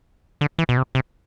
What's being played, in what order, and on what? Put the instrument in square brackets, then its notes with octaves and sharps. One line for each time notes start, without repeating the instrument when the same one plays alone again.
[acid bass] D3
E3
B2
C3
C3